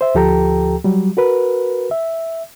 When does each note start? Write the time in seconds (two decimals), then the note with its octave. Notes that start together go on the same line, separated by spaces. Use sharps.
0.01 C5 E5
0.15 D2 F3 G4 A4 G5 A#5
0.84 F#3 G3
1.17 F#4 A#4 B4
1.91 E5